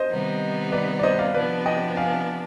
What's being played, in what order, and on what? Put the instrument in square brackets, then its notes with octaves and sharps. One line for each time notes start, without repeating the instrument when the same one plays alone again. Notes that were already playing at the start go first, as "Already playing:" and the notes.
Already playing: [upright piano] C5 D#5
[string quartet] C3 D#3 G3 B3 D#4
[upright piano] B4 D5
D5
C5 D#5
D5 F5
[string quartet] C3 F3 B3 D4 [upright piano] B4 D5
[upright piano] D#5 G5
F5 G#5